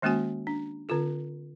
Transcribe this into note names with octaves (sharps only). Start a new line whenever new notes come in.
D#3 G#3 A#3 C#4 F#4 G#5
D4
D3 C4 F4 A4